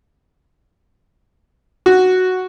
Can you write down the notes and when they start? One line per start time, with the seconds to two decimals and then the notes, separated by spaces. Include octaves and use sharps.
1.86 F#4